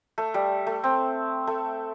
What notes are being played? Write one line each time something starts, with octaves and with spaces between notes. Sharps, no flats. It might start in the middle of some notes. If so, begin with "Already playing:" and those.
A3
G3
A3
C4
A3